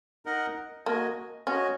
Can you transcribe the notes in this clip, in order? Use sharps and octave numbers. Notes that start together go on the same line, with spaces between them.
D#4 A#4 D#5 F#5
A#3 F#4 D#5 G#5
C#4 F#4 D#5 G#5